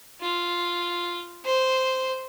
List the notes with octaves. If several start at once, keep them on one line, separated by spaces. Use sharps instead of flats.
F4
C5